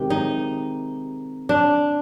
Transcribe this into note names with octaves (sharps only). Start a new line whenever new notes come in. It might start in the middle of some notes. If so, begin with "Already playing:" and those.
Already playing: C3 D#3 G#3 G4
D#4
D4